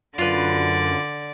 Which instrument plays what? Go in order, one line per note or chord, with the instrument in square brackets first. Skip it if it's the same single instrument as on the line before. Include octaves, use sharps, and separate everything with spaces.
[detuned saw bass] F#2 [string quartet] D3 D5 [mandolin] F4 B4